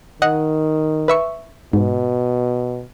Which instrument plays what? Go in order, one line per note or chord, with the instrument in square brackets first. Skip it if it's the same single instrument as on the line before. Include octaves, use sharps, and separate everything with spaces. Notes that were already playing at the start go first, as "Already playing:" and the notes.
[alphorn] D#3 [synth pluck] D#5 F#5
[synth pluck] B4 E5 C#6
[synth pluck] G#2 [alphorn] B2